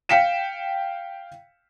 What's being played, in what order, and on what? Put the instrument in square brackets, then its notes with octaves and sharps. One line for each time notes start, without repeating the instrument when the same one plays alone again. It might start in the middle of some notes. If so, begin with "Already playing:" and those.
[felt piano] F5 G5 B6 C#7 E7